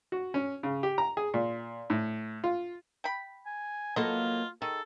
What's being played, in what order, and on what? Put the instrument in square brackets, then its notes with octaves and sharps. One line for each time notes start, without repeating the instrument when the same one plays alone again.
[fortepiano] F#4
C#4
C#3
G4
A#5
G#4
A#2
A2
F4
[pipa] G5 B5
[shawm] G#5
[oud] F#3 A#3 A4 [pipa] B3 D#5 C6 [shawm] F4
[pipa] D#3 [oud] G#4 [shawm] A4